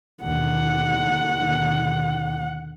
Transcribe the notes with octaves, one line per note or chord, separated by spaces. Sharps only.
D#2 B2 D3 F#5